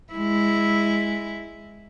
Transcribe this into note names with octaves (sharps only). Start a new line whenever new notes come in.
G#3 E4